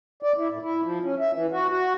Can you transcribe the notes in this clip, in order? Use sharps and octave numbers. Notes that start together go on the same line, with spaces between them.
D5
E4
A2
E4
F3
C#4
E5
E3
F#4
F#4